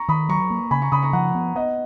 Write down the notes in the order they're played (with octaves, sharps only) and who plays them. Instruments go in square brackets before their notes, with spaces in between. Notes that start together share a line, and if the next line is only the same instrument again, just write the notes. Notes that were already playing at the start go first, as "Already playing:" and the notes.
Already playing: [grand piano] A#5 C#6
[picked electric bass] D#3 [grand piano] B5 D#6
[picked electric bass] F#3 [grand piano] A#5 C#6
[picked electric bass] A#3
[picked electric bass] C#3 [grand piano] G#5 B5
[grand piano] A#5 C#6
[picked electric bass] C#3 [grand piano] B5 D#6
[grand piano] A#5 C#6
[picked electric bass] F3 [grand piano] F#5 A#5
[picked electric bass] B3
[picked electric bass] B3 [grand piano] D#5 F#5